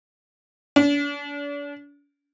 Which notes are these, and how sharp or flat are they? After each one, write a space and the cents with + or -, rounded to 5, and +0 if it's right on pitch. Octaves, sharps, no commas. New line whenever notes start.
D4 -40